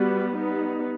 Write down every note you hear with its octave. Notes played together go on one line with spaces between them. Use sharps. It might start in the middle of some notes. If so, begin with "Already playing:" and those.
Already playing: G3 B3 F#4
G3 B3 D#4